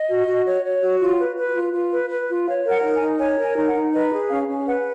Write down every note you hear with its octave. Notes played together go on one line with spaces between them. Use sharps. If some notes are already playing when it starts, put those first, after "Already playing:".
Already playing: D#5
F#4
F#4
C#5
C#5
F#4
F4
B4
B4
F4
F4
B4
B4
F4
C#5 F5
A#4
F#5
D#4
G#5
D#4
C#5 G#5
A#4
G#5
D#4
F#5
D#4
B4 D#5
G#4
C#4 F5
C#4
B4 F#5